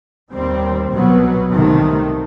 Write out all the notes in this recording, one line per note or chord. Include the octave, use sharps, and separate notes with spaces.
D#2 D#3 G3 C4
C2 B2 F#3 B3
C2 C3 D#3 A3